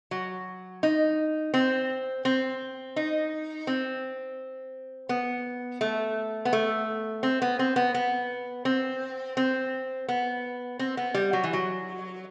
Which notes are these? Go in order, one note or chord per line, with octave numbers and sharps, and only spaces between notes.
F#3
D#4
C4
C4
D#4
C4
B3
A3
B3
A3
C4
B3
C4
B3
B3
C4
C4
B3
C4
B3
G3
F#3
E3
F#3